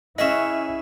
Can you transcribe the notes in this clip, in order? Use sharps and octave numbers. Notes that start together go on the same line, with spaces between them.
C#4 E4 G#4 D#5 E5 F#5 E7